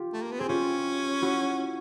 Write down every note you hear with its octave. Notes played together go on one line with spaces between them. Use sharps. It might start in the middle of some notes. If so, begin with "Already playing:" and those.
Already playing: F4 G4
A3
A#3
B3
C4 G#4
C#4 F4 G4
E4 F#4